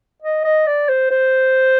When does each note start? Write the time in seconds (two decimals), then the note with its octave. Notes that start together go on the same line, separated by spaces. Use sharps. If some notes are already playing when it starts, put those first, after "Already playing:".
0.22 D#5
0.44 D#5
0.66 D5
0.89 C5
1.11 C5